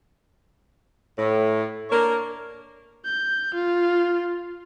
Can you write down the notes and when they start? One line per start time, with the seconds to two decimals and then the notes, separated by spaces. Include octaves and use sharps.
1.17 A2
1.90 A#3 D4 A#4 C#5
3.05 G6
3.54 F4